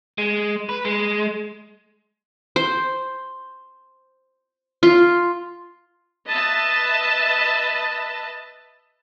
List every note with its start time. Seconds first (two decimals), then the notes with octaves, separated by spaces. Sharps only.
0.18 G#3
0.69 B4
0.85 G#3
2.56 C5
4.83 F4
6.29 B4 D#5 E5 A5